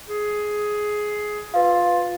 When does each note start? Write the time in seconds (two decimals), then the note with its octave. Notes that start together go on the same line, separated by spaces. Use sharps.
0.09 G#4
1.54 F4 B4 F5